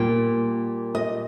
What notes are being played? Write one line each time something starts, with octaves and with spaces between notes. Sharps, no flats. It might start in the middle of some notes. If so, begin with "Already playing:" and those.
Already playing: A#2 G3 A#3 G5
D#5